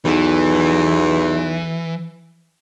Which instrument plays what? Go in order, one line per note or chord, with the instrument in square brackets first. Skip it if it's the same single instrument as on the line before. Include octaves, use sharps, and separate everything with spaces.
[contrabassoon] B1 [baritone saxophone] E2 [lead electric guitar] E3